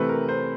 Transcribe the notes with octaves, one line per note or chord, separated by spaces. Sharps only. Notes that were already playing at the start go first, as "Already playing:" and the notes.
Already playing: C3 E3 A3 C4 B4
A#4
C5